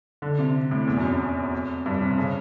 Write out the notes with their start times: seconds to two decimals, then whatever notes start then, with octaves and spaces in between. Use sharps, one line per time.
0.22 D3
0.39 C3
0.71 A2
0.87 E2
0.97 F#2
1.04 F2
1.86 G2
2.02 C3
2.18 C#3